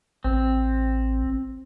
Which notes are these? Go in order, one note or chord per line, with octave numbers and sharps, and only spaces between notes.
A1 C4